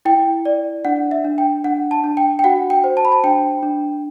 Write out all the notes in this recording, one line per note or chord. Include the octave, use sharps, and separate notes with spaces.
E4 G5
D5
D4 F#5
E5
D4
G5
D4 F#5
A5
D4
G5
G5
F#4 F#5
G5
C5
A5
B5
A5
D4 G5
D4